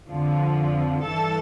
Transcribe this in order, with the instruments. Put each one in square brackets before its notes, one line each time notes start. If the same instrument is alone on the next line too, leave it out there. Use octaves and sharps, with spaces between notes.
[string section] F2 D3 F3
G2 E3 A4 A5